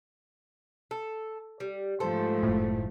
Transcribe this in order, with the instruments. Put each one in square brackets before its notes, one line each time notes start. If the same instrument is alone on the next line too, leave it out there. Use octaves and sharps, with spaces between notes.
[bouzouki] A4
G3
[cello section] G#2 F3 A3 [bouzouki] A4 C5
[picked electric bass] F#1 A2